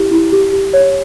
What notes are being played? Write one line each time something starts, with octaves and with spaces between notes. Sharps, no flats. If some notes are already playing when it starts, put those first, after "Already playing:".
Already playing: E4 G4
E4
G4
G4
C#5